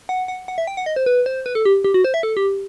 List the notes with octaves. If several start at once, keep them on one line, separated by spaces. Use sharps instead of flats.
F#5
F#5
F#5
E5
G5
F#5
D#5
C5
B4
C5
B4
A4
G4
G4
F#4
C5
E5
A4
G4